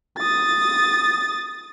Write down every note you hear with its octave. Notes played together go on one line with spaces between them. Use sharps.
D#6 A6